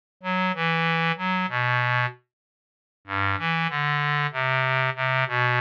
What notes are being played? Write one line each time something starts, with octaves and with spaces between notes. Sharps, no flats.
F#3
E3
F#3
B2
G2
E3
D3
C3
C3
B2